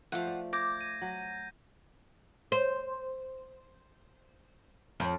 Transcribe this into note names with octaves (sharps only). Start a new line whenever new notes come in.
F3 A3 F4 C5 F#5
D5
D6 G6 G#6 A#6
D#7
F#3
C5
F2